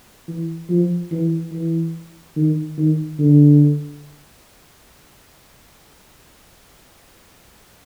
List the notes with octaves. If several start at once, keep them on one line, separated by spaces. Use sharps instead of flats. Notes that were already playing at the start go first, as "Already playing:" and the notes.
E3
F3
E3
E3
D#3
D#3
D3